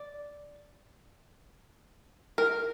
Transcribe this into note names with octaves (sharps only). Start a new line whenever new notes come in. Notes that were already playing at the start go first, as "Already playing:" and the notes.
Already playing: D5
A#4